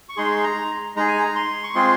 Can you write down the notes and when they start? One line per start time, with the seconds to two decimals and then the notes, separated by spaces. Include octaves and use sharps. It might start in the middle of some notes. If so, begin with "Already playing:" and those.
0.09 C#6
0.17 G#3 D#4 G#4 C6
0.44 A#5
0.96 G#3 D#4 G#4 A#5
1.08 G#5
1.18 A#5
1.35 C6
1.64 C#6
1.75 G#3 C4 F4 G#4 C6